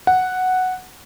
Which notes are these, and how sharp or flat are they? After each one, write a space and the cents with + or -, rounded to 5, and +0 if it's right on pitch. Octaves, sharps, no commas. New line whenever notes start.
F#5 +0